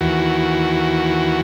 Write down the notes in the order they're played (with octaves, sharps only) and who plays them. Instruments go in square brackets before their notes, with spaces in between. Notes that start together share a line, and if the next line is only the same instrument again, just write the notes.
[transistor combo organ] D#2 E3 F#4